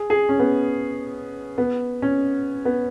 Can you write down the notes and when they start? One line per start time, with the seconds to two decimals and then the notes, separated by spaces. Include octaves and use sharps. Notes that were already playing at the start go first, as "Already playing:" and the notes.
Already playing: G#4
0.10 G#4
0.29 C#4
0.39 B3
1.58 B3
2.02 C#4
2.65 B3